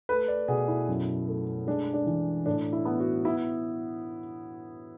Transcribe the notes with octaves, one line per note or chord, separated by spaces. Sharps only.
A3 B4
D5
B2 G#4
E4
F#2
A3
G#3 D4
D4
E3
A2 D4
E4
B3
F#4
B3 E4